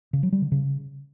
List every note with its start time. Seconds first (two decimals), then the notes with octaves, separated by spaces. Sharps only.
0.13 C#3
0.23 F#3
0.32 G3
0.42 D3
0.52 C#3